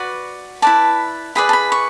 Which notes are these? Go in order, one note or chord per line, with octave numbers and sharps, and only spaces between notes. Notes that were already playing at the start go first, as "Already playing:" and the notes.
Already playing: F#4 B4 D5
E4 B4 D5 A5
E4 G#4 B4 D5 B5
A5
B5
C#6